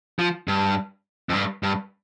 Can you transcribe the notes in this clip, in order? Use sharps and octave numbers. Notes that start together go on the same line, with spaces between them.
F3
G2
F2
G2
G2